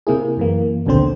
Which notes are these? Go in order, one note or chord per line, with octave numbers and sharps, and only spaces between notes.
C3 A#3 E4 G#4
F#2 E3 A#3
A#1 D#2 B2 D3 C4 C5